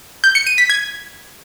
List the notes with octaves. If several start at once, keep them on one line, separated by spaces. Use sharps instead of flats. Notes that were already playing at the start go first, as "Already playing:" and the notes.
G6
C#7
D#7
B6
G#6